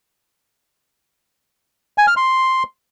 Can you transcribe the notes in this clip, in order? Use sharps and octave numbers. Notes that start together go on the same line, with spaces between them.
G#5
F6
C6